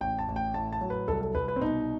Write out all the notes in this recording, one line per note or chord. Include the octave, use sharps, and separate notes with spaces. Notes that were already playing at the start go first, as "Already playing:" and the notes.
A1 G5
A5
A1
G5
A2 A5
A5
F#3
B4
C2 A4
A4
C2 B4
B4
C4
B2 D#4